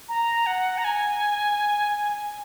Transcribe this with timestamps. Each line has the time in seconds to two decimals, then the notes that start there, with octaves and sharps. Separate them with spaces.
0.09 A#5
0.46 F#5
0.78 A#5
0.84 G#5